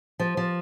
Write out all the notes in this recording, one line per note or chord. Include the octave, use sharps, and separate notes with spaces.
F3
F3